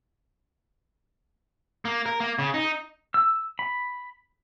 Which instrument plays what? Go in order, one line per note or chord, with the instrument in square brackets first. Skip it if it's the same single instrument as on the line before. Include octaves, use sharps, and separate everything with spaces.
[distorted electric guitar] A#3
A#4
A#3
C#3
D#4
[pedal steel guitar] E6
B5